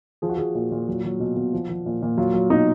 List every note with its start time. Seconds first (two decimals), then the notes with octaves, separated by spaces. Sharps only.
0.22 F3 G#4
0.29 F#4
0.37 F3 G#4
0.55 A#2 F#4
0.71 A#2
0.88 F#3
1.05 F#3
1.20 B2
1.36 B2
1.53 F3
1.69 F3
1.86 A#2
2.02 A#2
2.18 F#3 F4
2.34 F#3
2.50 B2 D#4